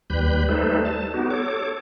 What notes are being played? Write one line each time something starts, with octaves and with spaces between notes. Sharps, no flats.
D#2 G3 B4 B5 G6
G3 A3 D#4 A4 B4 C5
A5
B3 D#4 F#4 G4
A4 C#5 D6